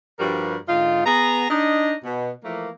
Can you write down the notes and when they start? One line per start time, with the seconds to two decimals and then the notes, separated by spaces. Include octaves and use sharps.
0.20 G2 F3 G3 F#4 A#4 B4
0.69 G#2 D3 D#4 F4
1.05 B3 G#4 A#5
1.50 D4 D#4 D#5
2.03 B2
2.45 E3 F3 A3 A#3